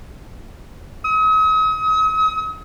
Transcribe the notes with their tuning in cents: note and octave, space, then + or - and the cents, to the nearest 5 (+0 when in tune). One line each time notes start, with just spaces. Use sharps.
D#6 +40